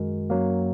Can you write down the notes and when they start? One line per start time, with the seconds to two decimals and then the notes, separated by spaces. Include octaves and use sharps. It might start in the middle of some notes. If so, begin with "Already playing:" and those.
Already playing: F#2 D#3 G#3 F#4 A#4
0.30 F#2 F#3 A#3